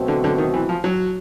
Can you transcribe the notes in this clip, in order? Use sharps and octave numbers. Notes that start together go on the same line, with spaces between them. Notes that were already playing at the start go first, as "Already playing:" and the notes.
Already playing: B2 F#3 A3 C4
D3
D3
D#3
E3
F3
F#3